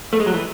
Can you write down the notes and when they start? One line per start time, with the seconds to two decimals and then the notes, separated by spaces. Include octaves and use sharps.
0.13 A3
0.20 G#3
0.26 F#3
0.34 E3